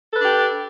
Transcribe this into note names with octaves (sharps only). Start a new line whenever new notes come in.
D4 G4 A4 B4